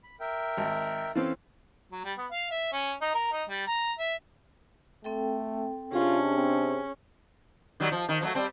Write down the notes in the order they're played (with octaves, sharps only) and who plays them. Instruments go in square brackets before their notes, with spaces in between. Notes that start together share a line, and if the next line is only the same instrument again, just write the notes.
[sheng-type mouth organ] B5
A#4 E5 G5
[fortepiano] G#1
[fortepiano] E3 C4 C#4 [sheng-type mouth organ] A4 F5 A5
[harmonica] F#3
G3
B3
F5
E5
C#4
D#4
A#4
D#4
G3
A#5
E5
[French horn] A3 [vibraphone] C4 A4 G5
[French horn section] C3 D4 [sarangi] C#4 [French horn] F4 [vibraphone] G#4
[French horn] C4
[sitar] D#3 F#3 G3
F3
D#3
F3 F#3 A3
G3 C4